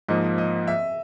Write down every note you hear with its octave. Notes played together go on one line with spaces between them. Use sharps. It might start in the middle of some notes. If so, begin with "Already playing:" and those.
G#2 F3 A#3 D#5
D#5
E5